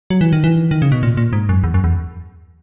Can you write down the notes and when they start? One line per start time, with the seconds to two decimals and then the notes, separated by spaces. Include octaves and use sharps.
0.10 F#3
0.21 E3
0.33 D#3
0.44 E3
0.71 D#3
0.82 C#3
0.92 B2
1.03 A#2
1.17 A#2
1.33 G#2
1.49 F#2
1.64 E2
1.74 F#2
1.84 E2